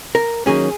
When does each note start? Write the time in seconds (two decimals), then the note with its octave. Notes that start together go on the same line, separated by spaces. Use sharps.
0.15 A#4
0.46 D#3 F#3 A#3 C#4 G#4